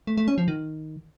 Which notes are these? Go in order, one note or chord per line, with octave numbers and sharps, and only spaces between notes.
A3
A3
C#4
F3
D#3